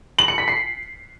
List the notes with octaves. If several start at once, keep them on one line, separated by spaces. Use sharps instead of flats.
F#7
C#7
B6
C7